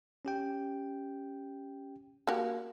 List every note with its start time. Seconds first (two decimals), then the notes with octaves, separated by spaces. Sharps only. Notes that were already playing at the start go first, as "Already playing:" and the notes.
0.25 C#4 G4 G5
2.27 A#3 F#4 G4